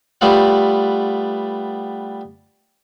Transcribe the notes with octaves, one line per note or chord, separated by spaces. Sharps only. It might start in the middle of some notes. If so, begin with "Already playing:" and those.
G3 A3 B3 F4 F#5